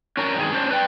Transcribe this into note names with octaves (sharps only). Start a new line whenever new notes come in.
C#4 D4 A#4
G2 D#3 G#4
C#4 D4 C5
B4 D5 G5